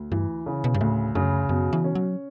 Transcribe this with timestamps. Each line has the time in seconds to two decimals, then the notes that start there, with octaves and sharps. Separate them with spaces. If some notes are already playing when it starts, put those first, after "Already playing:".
Already playing: D2
0.12 G2 E3
0.46 C#3
0.64 B2
0.74 G2
0.81 D2 A2
1.15 F#2 C#3
1.49 F#2 B2
1.73 E3
1.84 C#4
1.95 F#3